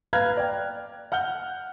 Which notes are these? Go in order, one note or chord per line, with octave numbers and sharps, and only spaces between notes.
B4 F5 A#5 F6 F#6 G#6
D5 G5
F#5 F6 G6 G7